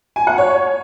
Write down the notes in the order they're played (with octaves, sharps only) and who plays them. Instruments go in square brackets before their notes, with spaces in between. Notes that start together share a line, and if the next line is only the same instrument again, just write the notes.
[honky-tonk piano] G#5
F#5
C#5